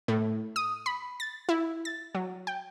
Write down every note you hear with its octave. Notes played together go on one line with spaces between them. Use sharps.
A2
D#6
B5
A6
E4
A6
F#3
G5